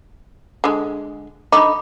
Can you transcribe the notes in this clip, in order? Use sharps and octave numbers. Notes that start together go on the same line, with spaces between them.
D3 G#3
D3 D#4 B5 D6